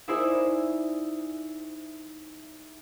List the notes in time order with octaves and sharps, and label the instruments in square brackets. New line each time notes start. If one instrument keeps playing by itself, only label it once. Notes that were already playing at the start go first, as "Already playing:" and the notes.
[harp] D#4 E4 G#4 C5 D5 E5